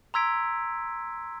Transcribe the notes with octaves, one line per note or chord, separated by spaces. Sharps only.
A#5 C6 E6 G#6 B6 D7